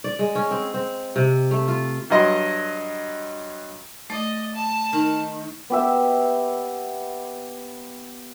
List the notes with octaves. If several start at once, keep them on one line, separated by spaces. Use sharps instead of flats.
D5
G#3
C#4
C4
C4
C3
A3
F4
G2 F#3 D#5 C6
A3 D5 D#5
A5
D#3
B3 G4 E5